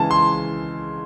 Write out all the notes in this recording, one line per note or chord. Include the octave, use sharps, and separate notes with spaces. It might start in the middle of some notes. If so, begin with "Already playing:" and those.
Already playing: C#3 E3 G#3 A5
C6